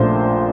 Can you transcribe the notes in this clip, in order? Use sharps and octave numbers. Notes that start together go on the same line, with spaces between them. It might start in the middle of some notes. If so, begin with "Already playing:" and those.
Already playing: A#1 A#2 A3 C5